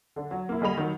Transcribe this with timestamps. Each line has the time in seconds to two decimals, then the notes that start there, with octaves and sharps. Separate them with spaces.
0.16 D3 D4
0.31 F#3
0.49 A#3 E4
0.61 D3 G3 G#4 D#5 B5 F7
0.78 D#3 F#3